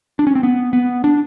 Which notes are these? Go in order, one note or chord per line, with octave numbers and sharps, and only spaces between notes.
D4
C#4
C4
B3
B3
D4